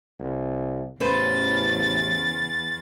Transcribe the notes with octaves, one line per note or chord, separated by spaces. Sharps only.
C2
A1 E2 C#3 B4 C5 A6